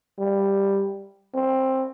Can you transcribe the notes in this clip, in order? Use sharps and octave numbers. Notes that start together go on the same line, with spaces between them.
G3
C4